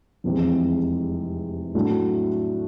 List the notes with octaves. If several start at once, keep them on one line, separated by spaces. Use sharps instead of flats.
F1 E2 C3 E3 G#3
A2 F#3 A3 D4